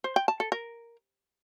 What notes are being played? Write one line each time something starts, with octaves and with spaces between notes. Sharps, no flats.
C5
G5
A5
A4
A#4